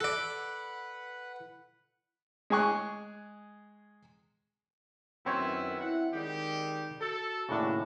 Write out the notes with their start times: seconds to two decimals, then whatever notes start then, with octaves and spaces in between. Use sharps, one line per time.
0.01 A4 B4 D5 F#5 F#6
2.50 G#3 G#4 G#5 C#6 F#6
5.26 F#2 D#3 B3 C4 E4 C#5
5.81 E4 F#5
6.14 D#3 G3 G#3 G4
7.01 F#4 A4
7.49 D#2 A2 C#3 D4 F#4